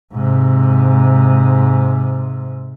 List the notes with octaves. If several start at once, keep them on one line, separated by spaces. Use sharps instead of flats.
G#2 C3